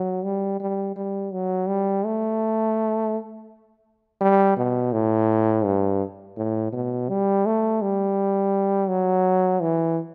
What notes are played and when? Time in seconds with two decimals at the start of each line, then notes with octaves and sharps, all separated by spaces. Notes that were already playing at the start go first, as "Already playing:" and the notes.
Already playing: F#3
0.24 G3
0.60 G3
0.96 G3
1.32 F#3
1.68 G3
2.05 A3
4.21 G3
4.57 B2
4.93 A2
5.65 G2
6.37 A2
6.73 B2
7.09 G3
7.46 A3
7.82 G3
8.89 F#3
9.62 E3